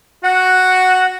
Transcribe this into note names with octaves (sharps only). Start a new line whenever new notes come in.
F#4 F#5